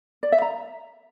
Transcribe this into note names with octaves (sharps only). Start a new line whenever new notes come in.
D5
E5
A#5